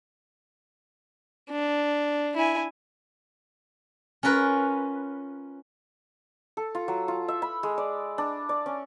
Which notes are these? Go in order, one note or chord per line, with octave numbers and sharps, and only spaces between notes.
D4
E4 G#5
C#4 F4 A#4 B4
A4
F4
F#3
F4
E5
B5
G#3
D5
D4
D5
C#4